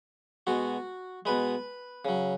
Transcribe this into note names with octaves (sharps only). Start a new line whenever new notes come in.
B2 G#3 F#4
B2 G#3 B4
C#3 F#3